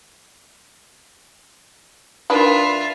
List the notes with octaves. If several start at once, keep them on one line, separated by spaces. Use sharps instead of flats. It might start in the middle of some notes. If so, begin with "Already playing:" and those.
D#3 D4 F4 B4 E5